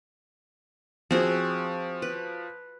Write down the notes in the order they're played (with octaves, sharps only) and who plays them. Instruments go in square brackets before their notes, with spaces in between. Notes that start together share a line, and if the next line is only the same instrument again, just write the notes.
[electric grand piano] F3 [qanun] C4 F#4 G#4
[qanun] B4